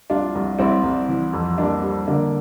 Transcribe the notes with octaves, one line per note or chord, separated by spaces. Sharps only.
C2 D4 F4
C2
C2 C4 E4
C2
E3
F2
G3 A#3 D4
G3
D3 A#3 D4